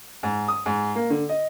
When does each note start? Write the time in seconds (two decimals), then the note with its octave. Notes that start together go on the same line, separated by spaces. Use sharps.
0.23 G#2
0.48 D#6
0.66 G#2
0.95 A#3
1.10 D3
1.29 D#5